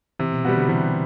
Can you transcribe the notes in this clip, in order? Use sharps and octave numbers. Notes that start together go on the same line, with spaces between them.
C3 E3
B2
B2 G3 B3 F#4
D3
C3 E3